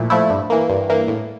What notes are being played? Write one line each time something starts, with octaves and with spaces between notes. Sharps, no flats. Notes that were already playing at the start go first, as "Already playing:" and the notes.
Already playing: A#2 F3 A3 E4
F3 A3 E4
G2
E3 A#3
G2
E3 A#3
A2